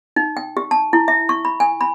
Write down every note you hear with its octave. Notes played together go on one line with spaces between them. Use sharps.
D#4
G5
G4
A5
E4
E5
C#6
B5
G#5
B5